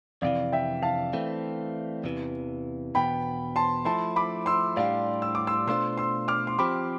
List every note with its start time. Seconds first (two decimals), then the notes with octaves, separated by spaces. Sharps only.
0.22 F2 C3 E3 D5 F5
0.53 E5 G5
0.83 F5 A5
1.13 E3 A3 C4
2.04 E2 C3 E3
2.95 E2 B2 B3 G5 B5
3.56 A5 C6
3.85 F3 A3 E4 A5 C6
4.16 B5 D6
4.46 C6 E6
4.77 A2 G3 D4 G4 D5 F5
5.22 E6
5.35 D6
5.47 C6 E6
5.67 B2 A3 D4 F4 C5 C6 E6
5.97 C6 E6
6.28 D6 F6
6.47 C6
6.59 F3 C4 G4 B5 D6